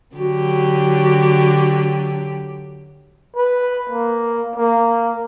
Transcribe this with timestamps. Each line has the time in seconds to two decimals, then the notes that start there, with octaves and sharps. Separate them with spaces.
0.15 D3 F#3 F#4 G4
3.36 B4
3.90 A#3
4.56 A#3